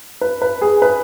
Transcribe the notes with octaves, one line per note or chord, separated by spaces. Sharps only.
B4
B4
G#4
B4